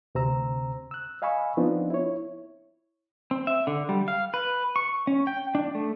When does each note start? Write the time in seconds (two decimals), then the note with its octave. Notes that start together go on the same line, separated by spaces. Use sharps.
0.15 D2 C3 C4 C5 A#5 E6
0.91 E6 F#6
1.22 D#5 F5 G#5 B5 C#6 E6
1.57 F3 B3 C4 D4 D#4 F4
1.90 E4 C#5
3.31 C4
3.47 E5
3.67 D3
3.89 G3
4.08 F5
4.34 B4
4.76 C#6
5.07 C#4
5.27 G5
5.55 D4
5.75 A3